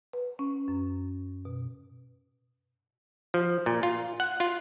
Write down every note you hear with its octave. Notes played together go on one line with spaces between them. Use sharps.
B4
C#4
F#2
B2
F3
A#2
F4
F#5
F4